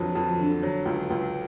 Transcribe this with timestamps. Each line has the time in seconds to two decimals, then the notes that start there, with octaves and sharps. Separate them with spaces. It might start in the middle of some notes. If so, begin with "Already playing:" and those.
Already playing: F2 D3 F#3 B4
0.15 F2
0.39 D3
0.63 F#3
0.85 C#2
1.10 C#2